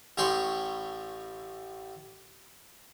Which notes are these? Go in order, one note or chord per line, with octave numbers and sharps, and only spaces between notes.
A1 A2 G#4 C#5 G5 C6